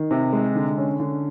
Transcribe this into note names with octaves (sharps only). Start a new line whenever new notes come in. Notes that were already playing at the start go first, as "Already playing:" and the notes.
Already playing: D#3
C3
G#3
D3
C#4
D3